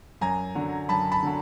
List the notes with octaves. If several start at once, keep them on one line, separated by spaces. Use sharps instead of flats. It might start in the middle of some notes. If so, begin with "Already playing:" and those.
F#2 G#5 A#5
D3 F#3
F#2 A5 B5
A5 B5
D3 F#3